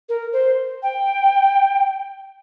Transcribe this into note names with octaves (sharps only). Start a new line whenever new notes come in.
A#4
C5
G5